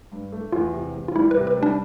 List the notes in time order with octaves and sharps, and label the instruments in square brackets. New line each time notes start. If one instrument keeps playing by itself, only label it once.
[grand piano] G2
A3
[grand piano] E2 [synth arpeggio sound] F4
[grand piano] C3
E2
[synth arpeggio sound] F4
[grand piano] G3 [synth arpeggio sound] E4
[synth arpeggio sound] B4
[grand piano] C3
[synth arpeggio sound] B4
[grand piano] G3
[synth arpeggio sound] D4